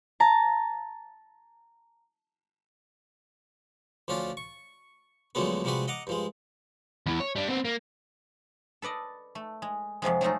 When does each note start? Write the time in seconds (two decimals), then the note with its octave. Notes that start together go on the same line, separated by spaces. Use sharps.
0.20 A5 A#5
4.08 D2 F3 C#4 D4 F4
4.37 C#6
5.35 D2 D3 F3 F#3 G#3 B3
5.64 C3 F3 G3 G#3 F#4 B4
5.88 D#5 F#5 A#5 D6
6.07 G2 F3 G#3
7.06 E2 E3
7.20 C#5
7.36 G3 D4
7.49 B3 C4
7.65 A#3
8.82 A4 B4 D5 D#5
9.35 A3
9.62 G#3
10.02 F2 C3 F3 G#3
10.21 F#3 G#3 A3 D#4 F4